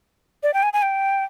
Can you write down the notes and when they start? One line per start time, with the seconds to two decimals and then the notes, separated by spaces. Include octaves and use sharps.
0.43 D5
0.54 G5
0.63 G#5
0.73 G#5
0.82 G5